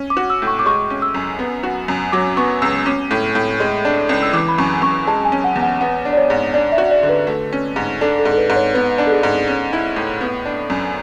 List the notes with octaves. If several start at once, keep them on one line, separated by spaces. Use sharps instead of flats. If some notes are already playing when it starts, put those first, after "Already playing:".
Already playing: C#4
D6
F#4
E6
A2
C#6
D6
G#3 C#6
C#4
E6
F#2
B3
F#4
F#2
F#3 D6
B3 C#6
C#2 E6
C#4 D6
A2
A2
G#3
D4
C#2
E6
E3 D6
B5
F#2 C#6
F#2 C#6
G#3 A5
G#5
C#4
F#5
E2
F#5
B3 F#5
D4
D5
C#5
G#2
D4 D5
E5
F#4
D5
D3
B4
A3
C#4
G#2
D4 A4
A4
G#2
A4
B4
G#2
C#5
B3 B4
D4
A4
G#4
G#2
C#4
E4
A2
B3
D4
F#2